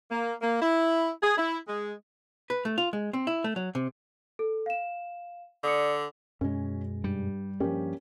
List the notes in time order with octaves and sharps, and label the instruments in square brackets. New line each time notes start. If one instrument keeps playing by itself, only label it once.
[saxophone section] A#3
A#3
E4
G#4
E4
G#3
[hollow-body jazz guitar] B4
A3
F4
G#3
C4
E4
A3
F#3
C3
[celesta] A4
F5 E7
[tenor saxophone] D3 [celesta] D5 D#6 C#7
[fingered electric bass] F#2 B2 G#3 [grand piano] C#4
[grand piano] G2 [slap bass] G3
[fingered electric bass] G2 F3 [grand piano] A#3 C#4 G4